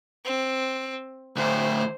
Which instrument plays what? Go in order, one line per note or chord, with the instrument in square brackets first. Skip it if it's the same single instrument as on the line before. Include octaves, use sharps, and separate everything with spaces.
[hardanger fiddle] C4
[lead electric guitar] D2 A2 [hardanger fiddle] C5